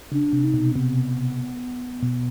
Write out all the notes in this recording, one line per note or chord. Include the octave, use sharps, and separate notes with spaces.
C#3 D4
C3
D#4
B2
C4
C3 B3
B2